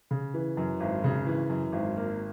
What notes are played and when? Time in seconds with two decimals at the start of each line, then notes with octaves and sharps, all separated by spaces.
0.11 C#3
0.34 E3
0.57 F#2
0.80 G#1
1.04 C#3
1.27 E3
1.49 F#2
1.72 G#1
1.96 A#3